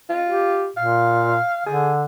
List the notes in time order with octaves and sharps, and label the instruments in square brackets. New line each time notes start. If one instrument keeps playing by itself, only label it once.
[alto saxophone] F4
[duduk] G4
[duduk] A#2 [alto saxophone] F5
[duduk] D3 [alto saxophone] G#4